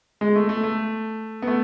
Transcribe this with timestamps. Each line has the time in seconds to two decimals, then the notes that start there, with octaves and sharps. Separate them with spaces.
0.21 G#3
0.36 A3
0.49 A3
0.63 A3
1.42 B3
1.47 A3